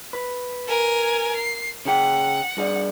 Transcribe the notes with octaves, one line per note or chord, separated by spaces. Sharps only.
B4
A#4 G#5
C7
C#3 G#4 F#5 G5
G2 G#4 D5